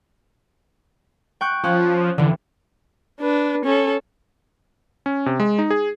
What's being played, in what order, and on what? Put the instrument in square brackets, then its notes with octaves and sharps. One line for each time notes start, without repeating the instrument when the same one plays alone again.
[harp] G5 C#6 F#6
[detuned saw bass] F3 [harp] C#4 F#6
[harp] F1 E3 [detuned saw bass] D3
[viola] D4 B4
C#4 A4
[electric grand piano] C#4
C3
G#3
D#4
G#4